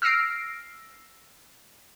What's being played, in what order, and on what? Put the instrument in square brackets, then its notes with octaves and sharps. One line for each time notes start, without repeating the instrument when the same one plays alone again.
[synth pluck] E6 F6 A#6 C7 D7